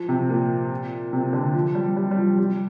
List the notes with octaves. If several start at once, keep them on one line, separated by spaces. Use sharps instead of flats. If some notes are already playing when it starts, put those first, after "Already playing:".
Already playing: F3
C3
A#2
C3
D3
F3
G3
G3
G3
F3
F3
G3